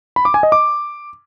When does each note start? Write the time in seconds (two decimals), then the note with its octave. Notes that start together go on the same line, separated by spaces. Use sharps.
0.16 B5
0.25 D6
0.34 G#5
0.43 D#5
0.52 D6